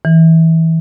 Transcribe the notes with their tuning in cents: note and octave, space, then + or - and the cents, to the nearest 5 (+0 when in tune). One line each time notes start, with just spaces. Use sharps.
E3 -25